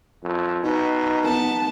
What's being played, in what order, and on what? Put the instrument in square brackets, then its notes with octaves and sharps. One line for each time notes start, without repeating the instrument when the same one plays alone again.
[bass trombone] F2
[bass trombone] B2 [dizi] D#4
[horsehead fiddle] B3 A5